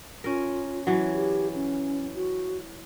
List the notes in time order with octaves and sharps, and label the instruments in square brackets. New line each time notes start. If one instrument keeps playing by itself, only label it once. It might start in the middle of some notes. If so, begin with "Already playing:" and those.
[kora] C#4 A#4 [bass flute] F4
[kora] E3 F#3
[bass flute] G4
C#4
F#4